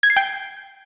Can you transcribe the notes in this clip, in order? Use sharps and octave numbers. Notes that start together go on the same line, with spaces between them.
G#6
C7
G5